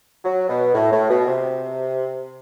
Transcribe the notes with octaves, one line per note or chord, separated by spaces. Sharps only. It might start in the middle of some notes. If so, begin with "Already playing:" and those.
F#3
B2
A2
A2
B2
C3